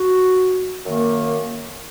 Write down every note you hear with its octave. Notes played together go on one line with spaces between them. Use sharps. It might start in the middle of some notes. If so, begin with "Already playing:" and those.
Already playing: F#4
F#2 D#3 A#3